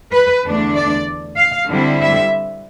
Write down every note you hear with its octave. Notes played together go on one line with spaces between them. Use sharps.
B4
E2 D3 A3 D4
D5
F5
D3 G3 C4 E4
E5